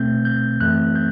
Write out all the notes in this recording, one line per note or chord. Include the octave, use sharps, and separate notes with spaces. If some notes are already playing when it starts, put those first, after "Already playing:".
Already playing: B2 A3 C4 G6
G6
F#2 E3 A3 C4 F#6
G6